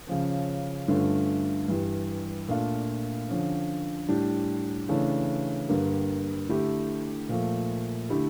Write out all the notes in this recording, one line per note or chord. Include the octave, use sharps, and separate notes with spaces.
C#3 F3 C#4
G2 D3 A3 C#4 F4
G2 E3 G3
A#2 A3 D4 F4
D3 F3 C#4
A2 G3 D4 G4
C#3 E3 A3 D4
G2 D3 G3 A#3
D3 A3 E4 G4
A#2 F3 A3
D3 A3 E4 G4